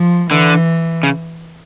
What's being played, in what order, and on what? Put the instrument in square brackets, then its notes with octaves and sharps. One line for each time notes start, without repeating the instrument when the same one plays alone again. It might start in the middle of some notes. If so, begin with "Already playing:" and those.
Already playing: [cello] F3
[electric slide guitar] D3 [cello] E3
[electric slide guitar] C#3